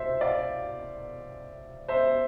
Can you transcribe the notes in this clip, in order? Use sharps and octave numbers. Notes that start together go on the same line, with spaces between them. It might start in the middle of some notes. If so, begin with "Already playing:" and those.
Already playing: C2 B2 C5 E5
D5 F5
C5 E5